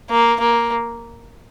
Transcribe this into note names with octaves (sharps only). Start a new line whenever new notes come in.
A#3
A#3